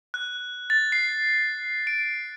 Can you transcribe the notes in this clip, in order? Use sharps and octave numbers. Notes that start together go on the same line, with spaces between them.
F#6
A6
C7
D7